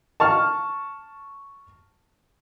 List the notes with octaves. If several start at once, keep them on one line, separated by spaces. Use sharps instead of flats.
A5 C#6 F6